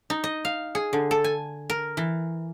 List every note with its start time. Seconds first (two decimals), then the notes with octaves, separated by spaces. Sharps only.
0.10 D#4
0.24 D#5
0.45 F5
0.75 G#4
0.93 D3
1.11 A4
1.24 G#5
1.70 A#4
1.97 E3